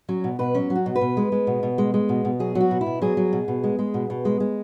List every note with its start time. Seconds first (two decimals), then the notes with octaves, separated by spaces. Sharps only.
0.09 F#3 C#4
0.24 B2
0.39 B2 B4
0.55 F#3 C#4
0.70 F#3
0.76 F#4
0.86 B2
0.96 B4
1.01 B2
1.17 G#3
1.32 G#3
1.47 B2
1.63 B2
1.78 G#3
1.94 G#3
2.09 B2
2.25 B2
2.40 F#3 G#4
2.55 F#3
2.61 F#4
2.71 B2
2.81 E4
2.86 B2
3.02 F#3 G#4
3.17 F#3
3.33 B2
3.48 B2
3.64 G#3
3.79 G#3
3.94 B2
4.10 B2
4.25 G#3
4.40 G#3